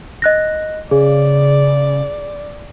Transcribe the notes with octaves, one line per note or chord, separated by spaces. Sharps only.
D#5 F#6 A#6
C#3 G#4 D5